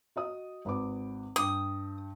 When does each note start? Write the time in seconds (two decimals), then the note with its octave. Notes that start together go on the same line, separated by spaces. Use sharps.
0.16 F#4 D#5 D#6
0.65 G#1 B4 D6
1.36 G2 G5 D#6